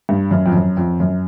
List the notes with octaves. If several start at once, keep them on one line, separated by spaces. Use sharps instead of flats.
G2
F#2
F2
F#2
F2
F#2